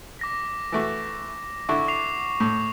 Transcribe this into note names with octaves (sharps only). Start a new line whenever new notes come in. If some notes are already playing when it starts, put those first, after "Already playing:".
D6 A#6 B6
E3 A3 F#4
D3 E4 C#6
D6 C7 F7
A2